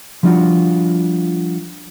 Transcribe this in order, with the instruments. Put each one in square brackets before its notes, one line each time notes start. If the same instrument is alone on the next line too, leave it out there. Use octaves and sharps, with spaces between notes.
[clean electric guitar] F3 G3 D4 F4 F#4